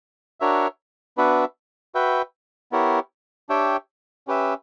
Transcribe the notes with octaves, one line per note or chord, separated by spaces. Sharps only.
D4 F#4 A#4 C#5 E5
B3 D4 F#4 B4 E5
F#4 B4 E5 G5
B3 E4 G4 A#4 C#5
D4 G4 C#5 E5 G5
C#4 G4 B4 E5